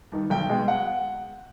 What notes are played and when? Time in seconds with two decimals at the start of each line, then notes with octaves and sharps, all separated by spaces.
0.12 G2 D#3
0.30 B1 G5
0.49 B2 G#3
0.68 F#5